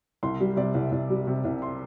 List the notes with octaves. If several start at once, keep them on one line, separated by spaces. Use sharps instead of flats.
C2 C6
G3
C3 D5
C2
C2
G3
C3
C2
C6